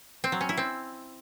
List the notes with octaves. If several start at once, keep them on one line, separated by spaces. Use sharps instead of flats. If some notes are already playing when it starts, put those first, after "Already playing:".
C4
F#3
C#4
E4
C4